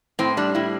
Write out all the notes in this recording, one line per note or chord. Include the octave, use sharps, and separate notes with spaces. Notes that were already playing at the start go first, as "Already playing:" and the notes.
A2 C4
G3 D4
A2 E4